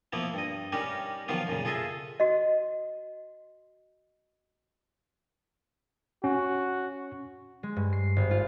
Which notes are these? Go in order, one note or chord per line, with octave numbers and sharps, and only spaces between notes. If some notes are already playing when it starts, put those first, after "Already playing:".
F3 A#3 B3 E4
G2 D#5
G3 C#4 D#4 G4 A#4
D#3 F3 F#3 B3 F4
F#2 A#2 C#3
F4 G#4 A4 D#5 E5
F#4 D#5
C#4 F#4
G#3
G2
C7
G#1
F4